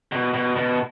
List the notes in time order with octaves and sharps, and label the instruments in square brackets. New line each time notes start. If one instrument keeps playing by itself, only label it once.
[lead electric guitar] B2
B2
B2